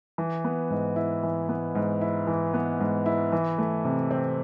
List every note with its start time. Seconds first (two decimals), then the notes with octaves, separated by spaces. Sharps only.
0.18 E3
0.44 B3
0.70 G#2
0.96 E4
1.23 E3
1.49 B3
1.75 G#2
2.01 E4
2.27 E3
2.54 B3
2.80 G#2
3.06 E4
3.32 E3
3.58 A3
3.85 C3
4.11 C4